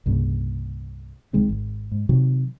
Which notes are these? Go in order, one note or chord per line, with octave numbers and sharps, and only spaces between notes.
C2 G2 A#2 C#3
C#2 D#3 G#3 C4
G#1
G#2
C3 D#3 F#3